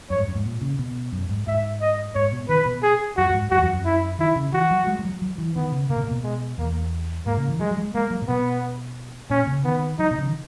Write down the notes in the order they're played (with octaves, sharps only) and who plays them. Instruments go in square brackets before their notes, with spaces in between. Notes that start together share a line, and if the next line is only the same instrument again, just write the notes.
[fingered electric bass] F#2 [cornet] C#5
[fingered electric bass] G#2
F#2
G#2
A#2
C#3
B2
F#2
G#2
[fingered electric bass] G#2 [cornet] E5
[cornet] D#5
[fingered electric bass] G#2 [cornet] C#5
[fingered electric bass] B2
[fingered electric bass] D#3 [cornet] B4
[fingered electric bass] B2
[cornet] G#4
[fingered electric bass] F#2 [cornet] F#4
[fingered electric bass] F#2
G#2
[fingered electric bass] F#2 [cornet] F#4
[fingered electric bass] E2
F#2
F#2
[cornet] E4
[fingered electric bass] D#3 [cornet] E4
[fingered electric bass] C#3
[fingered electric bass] E3 [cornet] F#4
[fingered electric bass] F#3
G#3
G#3
F#3
F#3
E3
[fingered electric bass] D#3 [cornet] B3
[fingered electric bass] C#3
[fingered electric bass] C#3 [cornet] A#3
[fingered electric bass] B2
A#2
B2
[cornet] G#3
[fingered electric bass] E2 [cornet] A#3
[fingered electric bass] G#2 [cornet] A#3
[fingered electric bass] C#3
E3
[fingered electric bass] F#3 [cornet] G#3
[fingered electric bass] F#3
G#3
[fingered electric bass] G#3 [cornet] A#3
[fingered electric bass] F#3
A#2
[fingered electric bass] B2 [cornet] B3
[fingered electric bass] A#2 [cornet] C#4
[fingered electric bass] C#3
[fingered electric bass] D#3 [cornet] B3
[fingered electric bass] F#3 [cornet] D#4
[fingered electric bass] B2
C#3
D#3